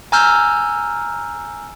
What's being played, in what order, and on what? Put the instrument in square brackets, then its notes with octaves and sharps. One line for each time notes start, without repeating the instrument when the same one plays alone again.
[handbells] G#5 A#5 E6 F6 G6